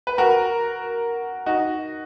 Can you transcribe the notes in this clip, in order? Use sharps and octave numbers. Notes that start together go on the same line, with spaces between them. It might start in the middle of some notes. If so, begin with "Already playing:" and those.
B4
F#4 A#4
D#4 F#4